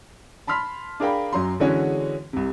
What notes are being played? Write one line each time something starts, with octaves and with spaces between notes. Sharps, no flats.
A5 B5 C6 F6 B6
D4 G#4 A#4 F5 G5 B5
F#2 F#3 A#5 C6
D3 E3 G#3 C#4 F#4 G#4
C2 C3